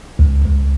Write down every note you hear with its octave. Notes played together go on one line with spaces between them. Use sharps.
C#2
C#2